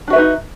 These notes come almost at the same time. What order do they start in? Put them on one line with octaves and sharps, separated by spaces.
D4 F#4 E5 B4 D#4